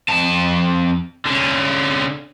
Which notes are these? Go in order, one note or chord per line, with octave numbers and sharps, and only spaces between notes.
F2 A5
D3 C#4